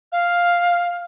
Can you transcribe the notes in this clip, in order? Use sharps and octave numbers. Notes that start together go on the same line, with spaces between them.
F5